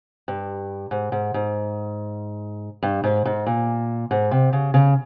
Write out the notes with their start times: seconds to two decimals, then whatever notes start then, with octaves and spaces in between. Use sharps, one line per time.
0.28 G2
0.91 G#2
1.12 G#2
1.34 G#2
2.83 G2
3.04 G#2
3.25 G#2
3.47 A#2
4.11 G#2
4.31 C3
4.53 C#3
4.74 C#3